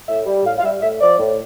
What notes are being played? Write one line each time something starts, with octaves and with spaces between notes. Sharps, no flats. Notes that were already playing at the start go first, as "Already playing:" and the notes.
A2 E5
G3
A2 F5
F5
G3 E5
A2 E5
F3 D5
A2